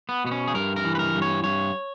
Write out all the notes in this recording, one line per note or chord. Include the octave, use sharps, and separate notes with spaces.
B3
B2 B3
C#4
G#4
G2 A#4
A#4
E3
B4
A#4
G2
C#5
G2 C#5